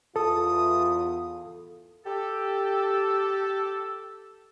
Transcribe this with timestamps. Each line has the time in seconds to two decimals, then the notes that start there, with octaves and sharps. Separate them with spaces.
0.16 E2 F4 A4 D#6
2.05 G4 A4